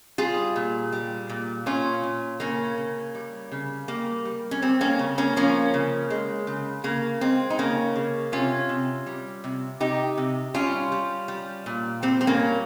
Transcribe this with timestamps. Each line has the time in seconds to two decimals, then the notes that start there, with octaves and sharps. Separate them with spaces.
0.18 G3 F4 G#4
0.56 A#2
0.92 G3
1.29 A#2
1.66 A#2 C#4 F4
2.03 A#2
2.40 C#3 A#3 C#4
2.77 C#3
3.15 G3
3.52 C#3
3.88 G3 A#3
4.25 G3
4.51 C#4
4.62 G3 C4
4.81 A#3 C#4
4.99 C#3
5.18 A#3 C#4
5.36 F3 A#3 C#4
5.74 C#3
6.10 G#3
6.47 C#3
6.84 C#3 A#3
7.21 G#3 C4
7.50 D#4
7.58 C#3 A#3 C#4
7.96 C#3
8.32 C3 C#4 F4
8.69 C3
9.06 G3
9.44 C3
9.80 C3 D#4 G4
10.18 C3
10.54 G3 C#4 F4
10.92 G3
11.28 G3
11.66 A#2
12.02 G3 C4
12.21 C4
12.27 A#3 C#4
12.40 A#2